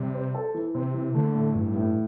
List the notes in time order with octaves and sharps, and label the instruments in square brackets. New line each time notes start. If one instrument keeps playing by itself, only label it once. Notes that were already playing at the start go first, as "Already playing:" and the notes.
Already playing: [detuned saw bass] C3 [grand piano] G3
[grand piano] C5
A4
E3
[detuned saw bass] C3 [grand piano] C4
[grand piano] E3
[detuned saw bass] D3 [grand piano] A3
[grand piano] A2
[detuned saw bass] G2 [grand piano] E3
[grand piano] A2